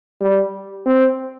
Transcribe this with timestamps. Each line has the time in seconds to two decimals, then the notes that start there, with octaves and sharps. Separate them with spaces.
0.21 G3
0.86 C4